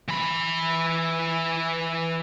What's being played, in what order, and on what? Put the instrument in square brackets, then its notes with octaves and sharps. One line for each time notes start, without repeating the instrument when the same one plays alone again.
[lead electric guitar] E3 B5